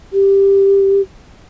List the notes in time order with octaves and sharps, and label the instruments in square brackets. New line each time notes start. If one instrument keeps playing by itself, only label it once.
[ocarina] G4